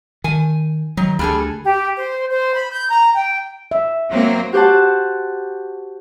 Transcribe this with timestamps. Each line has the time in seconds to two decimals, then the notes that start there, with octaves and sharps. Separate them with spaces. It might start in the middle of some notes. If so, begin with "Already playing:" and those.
0.24 D#3 G#5
0.97 D#3 F#3
1.19 D2 G3 G#4 A4
1.64 G4
1.95 C5
2.30 C5
2.55 B5
2.71 G6
2.88 A#5
3.15 G5
3.71 E5
4.10 F#3 A#3 C4
4.53 F#4 G4 C5 F#5 A5